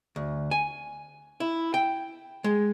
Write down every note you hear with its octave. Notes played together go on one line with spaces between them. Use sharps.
D2
G#5
E4
G5
G#3